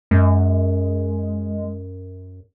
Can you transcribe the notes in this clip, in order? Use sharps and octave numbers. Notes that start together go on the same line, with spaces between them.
F#2 G#3